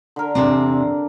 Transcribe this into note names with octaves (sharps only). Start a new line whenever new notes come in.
D3 A#4
E2 C3 C4 D4 D5